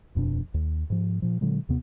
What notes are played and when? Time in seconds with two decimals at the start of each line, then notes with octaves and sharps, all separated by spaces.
0.15 D#1 F2 B2 D4
0.54 D#2
0.90 G#2 F3
1.22 A#2 F3
1.41 A#2 D3 F#3 G#3
1.69 D#2 C3 B3